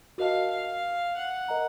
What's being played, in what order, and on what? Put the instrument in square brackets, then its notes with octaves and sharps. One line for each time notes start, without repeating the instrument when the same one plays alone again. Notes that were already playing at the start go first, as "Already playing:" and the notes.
[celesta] F#4 A#4 D#5 A5 [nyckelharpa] F5
[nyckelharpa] F5
F#5
[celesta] A#4 D#5 A#5